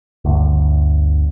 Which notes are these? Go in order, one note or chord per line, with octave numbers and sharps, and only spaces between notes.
G1 D2